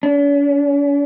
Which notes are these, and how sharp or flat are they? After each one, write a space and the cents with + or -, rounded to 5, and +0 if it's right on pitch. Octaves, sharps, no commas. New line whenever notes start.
C#4 +45